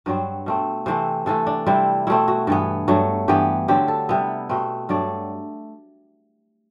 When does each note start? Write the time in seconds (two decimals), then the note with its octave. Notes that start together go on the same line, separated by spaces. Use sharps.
0.06 G2 F#3 C4 B4
0.46 B2 A3 C4
0.86 C3 E3 A3 C4 C5
1.26 C3 E3 A3 A4
1.47 D4
1.66 C3 G3 C4 E4
2.07 B2 A3 C4 E4
2.28 F#4
2.47 G2 E3 B3 A4
2.88 G2 F#3 A3
3.28 G2 E3 B3 G4
3.68 D3 F#3 C4 G4
3.88 A4
4.09 C3 G3 B3 E4
4.49 B2 A3 C4 B4
4.89 G2 F#3 A3 D5